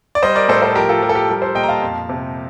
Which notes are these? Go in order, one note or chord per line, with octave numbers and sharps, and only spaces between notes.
D5
G3 C5 D#5
A#4 D5
A2 A4 C5
A4 C5
F3 G4 A#4
F4 A4
F3 G4 A#4
A4
G4
G3 G4 A#4
A4 C5
A#2 D#5 G5
A#5
F5 A5
F2
C3